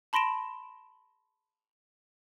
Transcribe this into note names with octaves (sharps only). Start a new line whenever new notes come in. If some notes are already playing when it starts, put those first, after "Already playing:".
A5 B5 C6 A#6 D7 E7